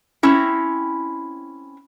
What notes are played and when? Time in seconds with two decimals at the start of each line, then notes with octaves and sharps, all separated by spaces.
0.23 C4 C#4 E4